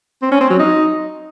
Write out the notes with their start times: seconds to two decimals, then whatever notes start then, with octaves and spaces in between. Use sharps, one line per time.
0.22 C4
0.31 C#4
0.40 C4
0.50 F#3
0.59 D#4